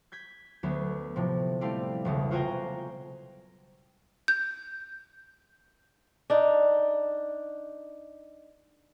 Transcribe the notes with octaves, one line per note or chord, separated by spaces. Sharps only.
G6 G#6 B6
D2 F#3 B3
A2 C3 F3
G3 A3 C4 E4 D5 F5
E1 B1 C#3
F4 F#4 C5 G5 G#5 A#5
G6
D4 D#4